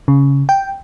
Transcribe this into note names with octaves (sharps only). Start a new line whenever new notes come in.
C#3
G5